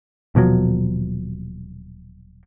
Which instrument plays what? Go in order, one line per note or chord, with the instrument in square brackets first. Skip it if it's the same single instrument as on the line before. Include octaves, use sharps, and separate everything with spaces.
[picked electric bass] D#1 B2 F3 F#3